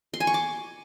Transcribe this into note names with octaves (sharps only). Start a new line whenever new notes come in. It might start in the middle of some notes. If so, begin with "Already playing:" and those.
C6
G#5
C#6
D6